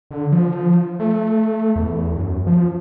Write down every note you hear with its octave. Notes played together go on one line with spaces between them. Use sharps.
D3
F3
A3
E2
F#2
F3